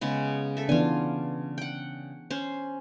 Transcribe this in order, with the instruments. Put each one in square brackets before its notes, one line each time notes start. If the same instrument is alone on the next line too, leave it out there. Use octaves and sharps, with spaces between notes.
[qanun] C#3 G#3 B3
A4 E5
[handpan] E3 B3 D4 [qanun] F4 G#5
[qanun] F#5 G5
C#4 C5